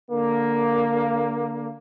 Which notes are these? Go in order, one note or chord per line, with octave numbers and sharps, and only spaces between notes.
D3 A#3